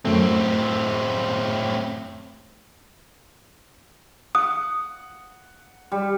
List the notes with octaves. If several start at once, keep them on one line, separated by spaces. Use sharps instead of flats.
F#2 A2 A3 C4
F#5 D#6
G3